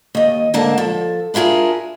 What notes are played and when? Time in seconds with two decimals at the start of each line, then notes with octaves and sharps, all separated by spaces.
0.15 D#2 D#5
0.54 G#2 D3 A#3 A5
0.78 F3 A4
1.34 D4 E4 F4 G#4 A#4